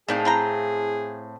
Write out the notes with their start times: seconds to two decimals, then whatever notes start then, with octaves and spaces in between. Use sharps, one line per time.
0.09 A2 D#3 C4 G#4 D5 F5
0.25 E4 G5 A#5